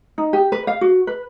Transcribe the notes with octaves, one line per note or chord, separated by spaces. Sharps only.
D#4
G4
B4
F5
F#4
B4